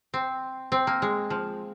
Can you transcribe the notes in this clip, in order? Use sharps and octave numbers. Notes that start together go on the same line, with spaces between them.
C4
C4
A#3
G#3
F3